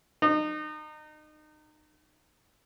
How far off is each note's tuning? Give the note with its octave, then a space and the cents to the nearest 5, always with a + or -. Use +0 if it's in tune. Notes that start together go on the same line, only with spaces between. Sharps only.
D#4 -30